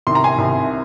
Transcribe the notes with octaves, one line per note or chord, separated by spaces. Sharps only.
C2 C3 D#3 C6
A#5
G#5 C6
C2 C3 D#3